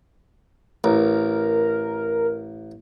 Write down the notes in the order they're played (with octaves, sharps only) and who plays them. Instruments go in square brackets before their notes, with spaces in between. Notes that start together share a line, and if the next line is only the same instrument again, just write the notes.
[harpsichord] A1 [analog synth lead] A#4